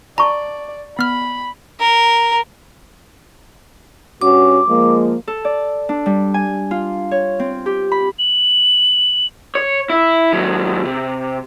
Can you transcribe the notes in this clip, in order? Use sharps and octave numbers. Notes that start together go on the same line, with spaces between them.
D5 A5 A#5 C#6
B3 B5 F6
A#4
G2 C#4 F#4 D6
F3 G#3 A#3
A4
D5
D4
G3
G#5
F4
C#5
C4
G4
B5
F#7
C#5
E4
D#2 F#3
C3